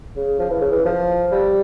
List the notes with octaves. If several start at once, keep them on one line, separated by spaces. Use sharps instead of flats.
C#3
F3
E3
C#3
E3
F3
G3